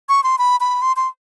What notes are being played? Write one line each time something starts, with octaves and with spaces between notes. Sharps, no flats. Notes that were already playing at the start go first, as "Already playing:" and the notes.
C#6
C6
B5
B5
C6
C6